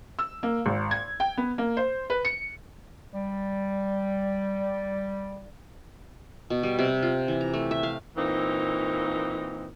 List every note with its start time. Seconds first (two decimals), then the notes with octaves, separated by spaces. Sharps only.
0.19 E6
0.43 A#3
0.66 G#1
0.91 G#6
1.20 G5
1.37 B3
1.58 A#3
1.77 C5
2.10 B4
2.25 C#7
3.13 G3 D5
6.50 B2
6.63 G3
6.79 C3
7.03 F4
7.28 E3
7.41 A#5
7.54 A3
7.71 E5
7.83 F5
8.17 A#2 E3 A#3 C4 D#4